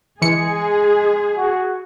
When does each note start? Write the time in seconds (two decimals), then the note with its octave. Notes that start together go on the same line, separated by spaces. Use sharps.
0.22 E3 G#3 G#4 C#7
1.36 F#4